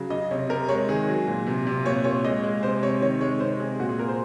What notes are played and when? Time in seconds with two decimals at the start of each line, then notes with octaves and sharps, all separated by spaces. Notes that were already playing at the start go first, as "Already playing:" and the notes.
Already playing: C#3 F#3
0.10 C#3 D#5
0.31 C3 C#5
0.49 C3 A#4
0.69 G#3 C#5
0.89 D#3 G#4
1.09 F#3
1.27 A#2
1.47 C3
1.67 C3
1.85 A#2 C#5
2.04 A#2 C#5
2.25 G#3 D#5
2.43 G#3
2.63 C3 C5
2.82 C3 C#5
3.02 D#3 C#5
3.21 G#3 C#5
3.40 C3 C5
3.60 C3 G#4
3.79 A#2 F#4
3.89 G#4
3.98 A#2 A#4
4.08 C5